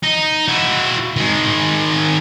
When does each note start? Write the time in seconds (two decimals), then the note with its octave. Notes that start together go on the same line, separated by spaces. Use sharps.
0.03 D#4
0.48 E4 F#4
1.16 D#3 G#3